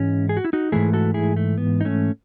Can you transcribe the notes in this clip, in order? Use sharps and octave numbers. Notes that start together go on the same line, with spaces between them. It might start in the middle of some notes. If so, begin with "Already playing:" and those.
Already playing: G#2 E3 G#3 C#4
G#4
F#4
E4
D#4 F#4
G#2 E3 A3 E4 G#4
F#4 A4
E4 G#4
A3
B3
D#4
A3 C#4